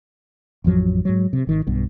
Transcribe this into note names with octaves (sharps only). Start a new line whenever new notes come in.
A1 F2 F3 F#3
G#2 F#3
C3
G#1 D#3
B1 G2 B2